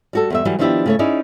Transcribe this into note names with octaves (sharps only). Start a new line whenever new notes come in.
G3 F#4 A4
E2 G3 E5
E3 F#3 G3
D#3 F3 B3 D4 E4 G4
C#3 A3 C#5
C#4 D#4 E4 G#4 C#5 D5